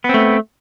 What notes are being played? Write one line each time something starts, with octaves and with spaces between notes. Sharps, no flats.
A3 B3 C4